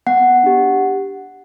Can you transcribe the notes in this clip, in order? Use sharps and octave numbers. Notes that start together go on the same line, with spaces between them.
B3 F#5
D4 G4